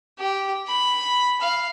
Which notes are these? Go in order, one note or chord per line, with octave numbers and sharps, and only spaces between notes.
G4
B5
F5